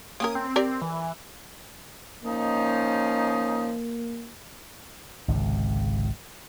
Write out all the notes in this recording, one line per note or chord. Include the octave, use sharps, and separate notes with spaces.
A#3 C#4 A#4 D#6
C4
G4 A#4 D5
E3
F3 A#3 C#4 D#4
G#1 C#2 C3